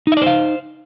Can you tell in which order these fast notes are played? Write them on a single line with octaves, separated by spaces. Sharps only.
D#4 E5 D5 C5 F5